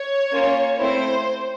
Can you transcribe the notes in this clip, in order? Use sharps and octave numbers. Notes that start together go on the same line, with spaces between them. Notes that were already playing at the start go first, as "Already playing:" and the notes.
Already playing: C#5
A#3 C#4 F4
A3 C4 E4 C5